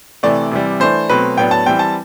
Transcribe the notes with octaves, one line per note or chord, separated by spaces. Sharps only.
C3 E3 A3 D5
C3 E3 G3
E3 A3 D4 C5
B2 F#3 A3 C4 B4
A2 F#3 B3 D4 G5
A5
E3 G3 C4 G5
A5